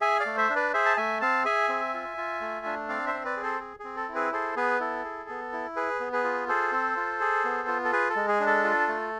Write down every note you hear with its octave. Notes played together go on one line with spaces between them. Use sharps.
G#4 E5 G#5
D5 F5
A3
C5 E5
D4
B4 D5
G#4 C5 E5
A5
A3 E5 G#5
C4 F5 A5
G#4 E5 G#5
C4
F4
F4
A3
D4
C4 D5 F5
C5 E5
C4
B4 D5
G#4
A4 C5
G#4
C4 G#4
A4
E4
G#4 B4
G#4 A4 C5
B3 G#4 B4
E4 A4
G#4
B3
E4
G#4 B4
B3
G#4 B4
F4
G#4 A4 C5
C4
F4
G#4
B3
F4
A4
G#4 B4
A4
G#3
G#4
D4
A4
F4
A3